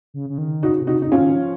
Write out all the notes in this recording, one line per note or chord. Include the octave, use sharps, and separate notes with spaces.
C#3
C#3
D#3
C#3 D#4 F#4
C3
D#4 F#4
C#3 D#4
C#4 F4
D#3
F3